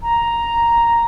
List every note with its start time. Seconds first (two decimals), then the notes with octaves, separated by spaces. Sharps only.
0.02 A#5